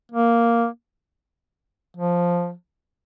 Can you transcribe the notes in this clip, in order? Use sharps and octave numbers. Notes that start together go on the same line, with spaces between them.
A#3
F3